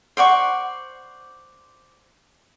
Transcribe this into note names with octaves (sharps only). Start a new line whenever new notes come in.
C5 D5 F#5 C#6